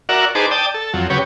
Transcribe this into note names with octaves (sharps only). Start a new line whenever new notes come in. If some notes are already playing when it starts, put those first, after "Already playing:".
F#4 A#4 D5 E5 F#5
D#4 G#4 B4 C5 A5 D6
D5 G5 A5 D#6
A4
F2 F#3
C#3 F#3 G4 B4 C#5